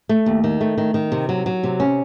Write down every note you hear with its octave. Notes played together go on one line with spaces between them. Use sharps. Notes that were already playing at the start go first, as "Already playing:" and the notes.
A3
D#2
D#3
A3
D#3
D#3
C3
F#3
F#3
C3
C#4